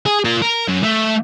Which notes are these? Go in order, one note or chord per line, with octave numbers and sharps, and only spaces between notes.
G#4
F4 A#4
A#4
F#2
A3